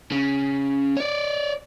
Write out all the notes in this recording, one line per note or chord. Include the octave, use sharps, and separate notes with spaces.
C#3
C#5 D5